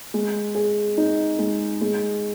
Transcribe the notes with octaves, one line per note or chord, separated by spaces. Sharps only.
G#3
G#4
D#4
G#3
G#3